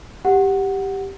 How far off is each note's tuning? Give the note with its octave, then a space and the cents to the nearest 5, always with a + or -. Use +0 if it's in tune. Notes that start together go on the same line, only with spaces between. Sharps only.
G4 +0 F#5 +0